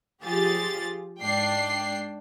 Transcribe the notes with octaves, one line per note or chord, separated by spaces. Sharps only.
F3 F4 G4 G#4 A6
G#2 D4 D5 G5 C7